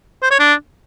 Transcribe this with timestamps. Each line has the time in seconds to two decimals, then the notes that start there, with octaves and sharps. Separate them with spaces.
0.22 C5
0.31 C#5
0.39 D4